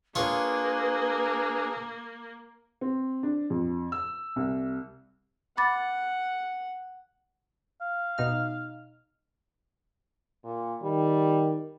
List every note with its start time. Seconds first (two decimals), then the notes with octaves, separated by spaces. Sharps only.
0.15 A#3 D4 F4 G#4 B4 C#5
2.81 C4
3.23 D4
3.50 F2
3.92 E6
4.36 C2
5.57 F#5 B5 D6 A6
7.81 F5
8.18 B2 D#4 F6
10.44 A#2
10.83 D#3 G3